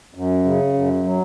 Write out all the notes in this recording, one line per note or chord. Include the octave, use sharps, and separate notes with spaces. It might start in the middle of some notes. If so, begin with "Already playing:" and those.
F#2
C#3
F#2
F#3